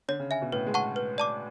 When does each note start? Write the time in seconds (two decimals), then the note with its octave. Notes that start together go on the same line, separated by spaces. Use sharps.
0.08 D3 C#5
0.20 C#3
0.31 E5 G#5
0.42 B2
0.52 A2 B4
0.67 G#3
0.74 F#5 A5 C#6
0.96 B4
1.18 D5 A5 D6